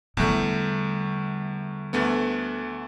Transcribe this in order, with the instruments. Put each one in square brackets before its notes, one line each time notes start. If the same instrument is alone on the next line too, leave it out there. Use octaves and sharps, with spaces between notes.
[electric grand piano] E2 A3 [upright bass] D3 G3
[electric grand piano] D2 A3 B3